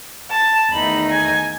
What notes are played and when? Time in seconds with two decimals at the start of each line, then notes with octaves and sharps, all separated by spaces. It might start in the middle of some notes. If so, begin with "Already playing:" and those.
0.31 A5
0.71 E2 D#3 A3 D#4 B5
1.11 G#5